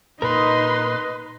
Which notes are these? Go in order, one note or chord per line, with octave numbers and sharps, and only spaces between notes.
A#2 D#4 A#4 B4 D#5 B5 C6